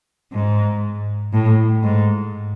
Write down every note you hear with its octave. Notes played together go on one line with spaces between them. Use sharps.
G#2
A2
G#2